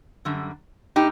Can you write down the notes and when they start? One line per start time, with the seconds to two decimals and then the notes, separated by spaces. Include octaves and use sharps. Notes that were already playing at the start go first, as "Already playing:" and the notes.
0.25 F#2 D3 G3
0.96 A2 D#4 G4